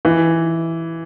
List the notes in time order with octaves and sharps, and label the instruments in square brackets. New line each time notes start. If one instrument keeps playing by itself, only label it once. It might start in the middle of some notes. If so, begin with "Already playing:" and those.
[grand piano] E3